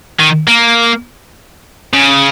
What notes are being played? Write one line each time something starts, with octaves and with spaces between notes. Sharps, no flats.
D#3
A#3
C#3